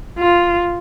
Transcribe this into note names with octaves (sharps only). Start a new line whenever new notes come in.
F4